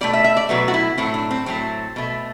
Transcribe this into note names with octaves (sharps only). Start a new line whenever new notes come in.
B2 F#3 A3 D5
E5
E5
D5
B2 F#3 A3 B4
F#4
E4
A2 F#3 A3 C4
D4
C4
A2 F#3 A3 C4
B2 A3